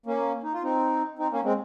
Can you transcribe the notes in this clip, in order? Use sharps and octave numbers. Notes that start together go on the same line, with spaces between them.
A#3 C#4
D#4
F4
C4 D#4
C4 D#4
A#3 C#4
G#3 C4